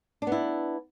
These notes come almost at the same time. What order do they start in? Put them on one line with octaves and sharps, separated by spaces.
D4 B3 E4